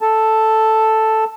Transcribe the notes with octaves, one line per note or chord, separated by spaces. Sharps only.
A4 A5